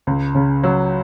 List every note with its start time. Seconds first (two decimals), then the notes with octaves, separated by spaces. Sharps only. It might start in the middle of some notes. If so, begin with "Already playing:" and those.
0.07 C#2
0.35 C#3
0.63 F#3